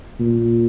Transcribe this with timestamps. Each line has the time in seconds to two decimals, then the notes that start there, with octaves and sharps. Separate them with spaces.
0.20 A#2